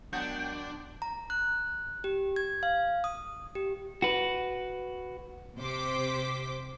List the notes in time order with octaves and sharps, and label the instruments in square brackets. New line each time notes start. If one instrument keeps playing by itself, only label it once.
[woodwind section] A#2 G#3 B3 [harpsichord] F#3 F#4 [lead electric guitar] D4 [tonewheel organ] G5
[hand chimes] A#5
F#6
G4
G#6
F5
D#6
G4
[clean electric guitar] F#4 B4
[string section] C3 C5 D6 B6